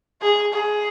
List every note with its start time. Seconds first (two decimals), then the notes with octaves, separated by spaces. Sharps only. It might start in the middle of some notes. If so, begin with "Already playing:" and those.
0.22 G#4
0.54 G#4